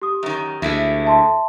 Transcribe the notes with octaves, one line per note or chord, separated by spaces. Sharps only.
G4 D#6
F#2 D#3
D2 G#3 A3 E4
E5 A5 C6